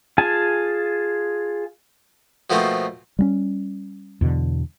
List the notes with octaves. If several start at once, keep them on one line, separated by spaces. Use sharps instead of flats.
F4 G#4 G#5 A5
B2 F3 A3 A#3 C4
G3 A#3 C#4
E2 B2 D3